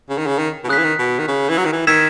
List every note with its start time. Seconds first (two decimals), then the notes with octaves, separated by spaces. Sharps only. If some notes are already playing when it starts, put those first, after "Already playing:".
0.10 C#3
0.18 D#3
0.27 C#3
0.39 D#3
0.64 B2
0.69 C#3 D#6 F#6 B6
0.78 E3
0.83 D#3
0.99 B2
1.19 D#3
1.28 C#3
1.49 E3
1.58 F#3
1.65 D#3
1.72 E3
1.87 D#3 E6 G#6 B6 E7